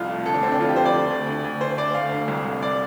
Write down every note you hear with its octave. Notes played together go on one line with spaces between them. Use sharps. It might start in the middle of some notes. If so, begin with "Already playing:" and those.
Already playing: C2 F2 F4
A3
D2 A4
D4
D2 C4
D4
F2 F4
G4
F2 C5
D5
D2
D2
D2
D2
D2 C5
D2 D5
D2 F5
D2
C2
C2
D5